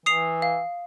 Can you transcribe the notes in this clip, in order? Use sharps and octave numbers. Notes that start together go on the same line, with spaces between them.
E3 D#6 C7 F7
F5